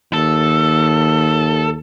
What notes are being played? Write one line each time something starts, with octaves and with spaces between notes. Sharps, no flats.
D#2 A4